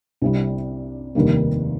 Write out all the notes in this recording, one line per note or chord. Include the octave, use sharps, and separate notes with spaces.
C2 C3 G3
F1 D#2 D#3 G3 A#3